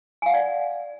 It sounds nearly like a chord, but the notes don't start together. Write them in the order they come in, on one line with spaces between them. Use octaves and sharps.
G#5 F5 F#5 D5